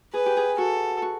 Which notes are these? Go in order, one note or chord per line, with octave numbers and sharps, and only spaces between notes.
G#4 B4
G4
G#4
F#4 A4
F#4